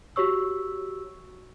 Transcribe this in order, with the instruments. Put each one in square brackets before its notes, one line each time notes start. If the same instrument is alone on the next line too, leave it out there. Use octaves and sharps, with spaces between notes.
[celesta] F#4 G4 C#5 C#6 E6